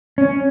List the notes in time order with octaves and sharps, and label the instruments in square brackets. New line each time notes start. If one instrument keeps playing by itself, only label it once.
[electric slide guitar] C#4